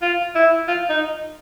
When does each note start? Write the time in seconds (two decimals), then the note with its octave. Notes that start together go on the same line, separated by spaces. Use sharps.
0.02 F4
0.35 E4
0.68 F4
0.90 D#4